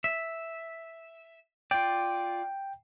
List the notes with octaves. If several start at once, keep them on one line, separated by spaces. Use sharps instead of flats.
E5
F4 D5 G5